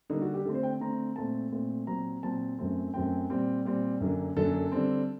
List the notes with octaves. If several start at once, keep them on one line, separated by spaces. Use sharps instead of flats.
D3 G3 A#3 D#4
F#4
G4
D3 A3 C4 A4
C5
G5
D3 A3 C4 A#5
A#2 A3 C4 A5
A#2 A3 C4
A#2 F#3 C4 A#5
A#2 F#3 C4 A5
F#2 F#3 A3 C4
F#2 F#3 A3 C4 G5
A#2 G3 C4
A#2 G3 C4
F#2 D3 F#3 A#3
F#2 D3 F#3 A#3 A4
D3 G3 C4